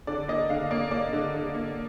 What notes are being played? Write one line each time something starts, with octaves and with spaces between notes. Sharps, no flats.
D3 D5
A#3 D#5
D3 F5
A#3 D5
A#3 D5
D3
D3
A#3